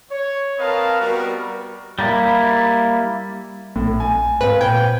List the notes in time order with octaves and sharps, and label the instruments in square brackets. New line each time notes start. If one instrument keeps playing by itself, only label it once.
[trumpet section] C#5
C4 A#4 B4 D#5 F5 A5
G3 B3 F#4 A#4
[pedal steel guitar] G3 A#3 E4
[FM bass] A#1 [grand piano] A2
[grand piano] G#5
[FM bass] G#2 [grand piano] C4 F5 [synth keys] B4
[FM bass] A#2 [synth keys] G5 [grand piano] G#6